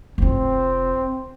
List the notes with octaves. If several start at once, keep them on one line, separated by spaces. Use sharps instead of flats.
F1 C4 F4